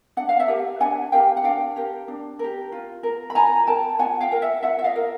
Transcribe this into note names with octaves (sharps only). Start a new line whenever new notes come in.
D4 F#5
F5
E5 F#5
G4 A#4
D4 F#5 G#5
G4 A#4 F5 G5
F#5
D4 F5 G5
G4 A#4
D4
G4 A#4
F4
A#4
B5
F4 G#5 A#5
A#4 G5 A5
F4 F#5 G#5
F5 G5
A#4
E5 F#5
F4 E5 F#5
E5
D#5 F5
A#4